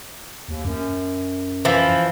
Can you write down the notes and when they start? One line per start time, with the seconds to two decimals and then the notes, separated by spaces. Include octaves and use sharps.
0.49 D#2
0.65 F#2
1.65 E3 F3 E4